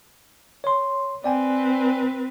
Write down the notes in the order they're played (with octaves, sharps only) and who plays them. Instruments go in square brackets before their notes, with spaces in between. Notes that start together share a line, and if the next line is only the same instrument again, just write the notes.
[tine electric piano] C#5 C6
[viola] C4 B4 [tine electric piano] D5 G5 G#5